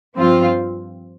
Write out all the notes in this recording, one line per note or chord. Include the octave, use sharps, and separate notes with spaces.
G2 F3 C4 F4